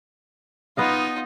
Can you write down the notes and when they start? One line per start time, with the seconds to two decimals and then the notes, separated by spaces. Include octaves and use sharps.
0.77 B3 D#4 F4 D#5 F5